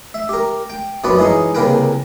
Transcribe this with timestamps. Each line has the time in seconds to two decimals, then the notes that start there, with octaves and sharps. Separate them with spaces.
0.14 E5
0.29 G4 A#4
0.70 G5
1.04 F#2 F3 B3 B4 D5
1.18 E3 G#3 C#4 D#4
1.55 C2 C#3 A#3 A#4 B4 G5